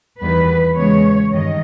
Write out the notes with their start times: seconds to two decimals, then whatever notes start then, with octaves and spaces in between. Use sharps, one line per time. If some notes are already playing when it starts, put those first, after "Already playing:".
0.21 E2 D#3 G3 B4
0.76 E2 C#3 G#3 C#5
1.32 G2 D#3 D#5